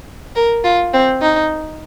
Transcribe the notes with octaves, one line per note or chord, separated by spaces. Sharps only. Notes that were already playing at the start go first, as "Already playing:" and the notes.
A#4
F4
C4
D#4